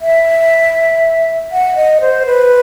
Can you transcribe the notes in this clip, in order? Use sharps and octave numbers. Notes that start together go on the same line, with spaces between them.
E5
F#5
D#5
C5
B4